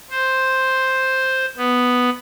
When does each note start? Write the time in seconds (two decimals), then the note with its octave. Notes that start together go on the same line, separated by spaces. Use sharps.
0.10 C5
1.57 B3